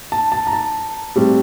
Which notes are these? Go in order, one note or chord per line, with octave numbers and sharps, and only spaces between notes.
A5
A5
A#5
A5
A2 G3 C4